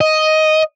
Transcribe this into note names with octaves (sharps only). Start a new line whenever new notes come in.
D#5